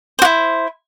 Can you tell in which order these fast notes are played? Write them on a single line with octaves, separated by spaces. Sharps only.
C5 F#4 E4